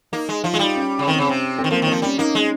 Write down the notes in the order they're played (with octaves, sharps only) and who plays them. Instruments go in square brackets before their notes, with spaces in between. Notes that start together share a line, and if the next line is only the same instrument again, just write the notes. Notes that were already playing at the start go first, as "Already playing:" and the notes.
[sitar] A#3 [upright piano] D#4
[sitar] G#3
[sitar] F3 [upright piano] F4
[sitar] G#3
[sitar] G3 [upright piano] D#4
[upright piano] C#4
[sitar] C#3
[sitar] D#3 [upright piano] C4
[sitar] C#3
C3
[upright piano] C4
[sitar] D#3
[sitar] F3 [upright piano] A#3
[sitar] D#3
[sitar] F3 [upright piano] C4
[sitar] G3 [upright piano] C#4
[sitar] A#3 [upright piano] D#4
[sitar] G#3